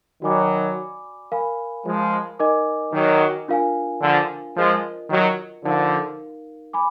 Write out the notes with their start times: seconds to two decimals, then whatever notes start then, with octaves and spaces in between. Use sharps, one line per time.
0.22 D#3 F#3 F#4 D5 G#5 B5 D6
1.32 A#4 F5 G#5 B5
1.86 F3 G#3
2.39 D#4 A#4 D#5 G#5 D6
2.93 D#3 F#3
3.48 D4 F4 A#4 F5 G#5
4.02 D3 F3
4.56 F3 G#3 F4 A#4 D#5
5.10 D#3 F#3
5.65 D3 F3 D#4 A#4 F5
6.73 G#5 B5 D6